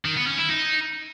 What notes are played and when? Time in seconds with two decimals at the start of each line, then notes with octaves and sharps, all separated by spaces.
0.05 D#3
0.16 B3
0.27 C#4
0.38 E4
0.49 D#4